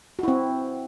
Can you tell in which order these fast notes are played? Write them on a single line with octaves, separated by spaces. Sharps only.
F#4 E4 C4